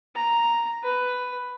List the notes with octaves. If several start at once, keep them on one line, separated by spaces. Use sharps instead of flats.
A#5
B4